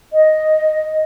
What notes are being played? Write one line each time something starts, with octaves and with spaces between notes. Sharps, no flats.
D#5